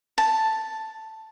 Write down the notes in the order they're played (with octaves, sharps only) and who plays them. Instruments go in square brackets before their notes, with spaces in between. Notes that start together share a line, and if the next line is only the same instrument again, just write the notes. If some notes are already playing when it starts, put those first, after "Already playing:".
[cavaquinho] A5